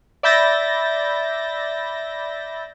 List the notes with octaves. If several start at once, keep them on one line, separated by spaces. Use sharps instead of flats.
D5 E5 B5 G6 A6 A#6